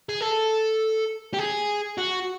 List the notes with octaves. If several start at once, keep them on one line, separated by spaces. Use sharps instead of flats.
G#4
A4
G4
G#4
F#4